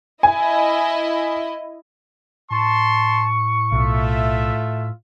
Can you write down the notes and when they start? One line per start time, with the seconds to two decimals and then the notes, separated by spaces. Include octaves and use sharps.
0.23 E4 D#5 G#5
2.51 A2 A5 C6 C#6
3.72 B1 A3 F4 E5